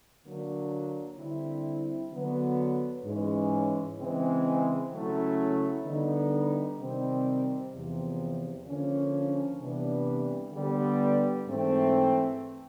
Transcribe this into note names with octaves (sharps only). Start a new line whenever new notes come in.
D3 F#3 A#3 D4
D3 G3 C4 E4
D3 F#3 B3
G#2 E3 G#3 C#4
C#3 E3 G#3 C4
C#3 F#3 A3 C#4 E4
D3 G3 B3 D#4
C3 D#3 G3 C4
E2 C3 F3
D3 F3 A#3 C#4
C3 E3 G3 B3 D4
D3 G3 B3
G#2 E3 A3 C4